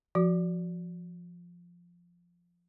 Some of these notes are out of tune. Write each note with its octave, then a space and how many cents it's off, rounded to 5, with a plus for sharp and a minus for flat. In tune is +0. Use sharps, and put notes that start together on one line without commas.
F3 +0 F#4 +10